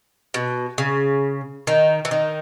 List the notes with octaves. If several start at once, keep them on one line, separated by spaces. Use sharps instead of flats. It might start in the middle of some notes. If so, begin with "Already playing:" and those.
B2
C#3
D#3
E3
D#3